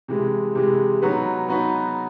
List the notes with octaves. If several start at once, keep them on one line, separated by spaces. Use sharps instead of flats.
C3 E3 G#3
C3 E3 G#3
F#3 B3 D#4 F#4 B4
F#3 B3 D#4 F#4 B4